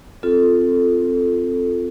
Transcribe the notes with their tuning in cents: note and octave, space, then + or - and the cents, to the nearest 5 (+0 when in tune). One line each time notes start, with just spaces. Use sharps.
C4 +0 F4 +0 A4 +0